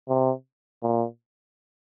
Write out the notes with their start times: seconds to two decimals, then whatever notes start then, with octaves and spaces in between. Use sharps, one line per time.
0.09 C3
0.83 A#2